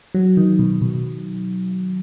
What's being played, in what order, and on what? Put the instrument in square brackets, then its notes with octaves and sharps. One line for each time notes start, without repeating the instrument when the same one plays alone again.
[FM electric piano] F#3
D#3
B2
B2